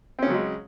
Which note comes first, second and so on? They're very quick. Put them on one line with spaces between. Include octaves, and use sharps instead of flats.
C4 C#4 C#3 F#3 G#3